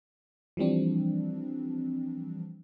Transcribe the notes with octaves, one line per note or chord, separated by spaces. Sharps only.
E3 F3 G3 C4 D4